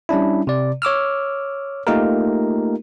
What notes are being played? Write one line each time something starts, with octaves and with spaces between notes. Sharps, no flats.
G3 C#4 D4 E4
C3 D5
C#5 D6 E6 F6
A3 A#3 D#4 F4 G4 A#4